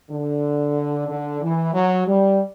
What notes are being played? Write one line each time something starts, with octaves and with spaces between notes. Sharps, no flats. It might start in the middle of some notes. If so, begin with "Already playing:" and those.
D3
D3
E3
F#3
G3